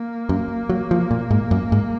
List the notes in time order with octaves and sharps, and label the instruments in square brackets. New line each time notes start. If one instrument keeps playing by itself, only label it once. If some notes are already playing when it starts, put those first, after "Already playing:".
Already playing: [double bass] A#3
[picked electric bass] F#2
F#3
F3
A#2
G#2
F#2
G#2